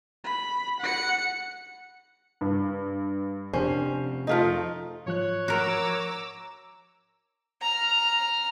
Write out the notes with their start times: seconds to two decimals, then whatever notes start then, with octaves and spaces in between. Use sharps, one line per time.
0.24 B5
0.80 F#5 C#7
2.41 G2
3.53 F2 C3 C#4 D4 G4 C5
4.27 F3 A3 D#4 D#5 F5 F6
5.06 G#2 F3 C#5 F#6
5.48 F#4 A#4 A#5 D6 E6
7.61 A#5 F6